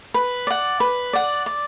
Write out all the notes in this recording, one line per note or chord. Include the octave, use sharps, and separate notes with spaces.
B4
D5 F#5
B4
D5 F#5
D5